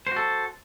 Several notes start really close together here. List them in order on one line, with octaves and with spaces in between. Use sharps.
C5 F#4 A4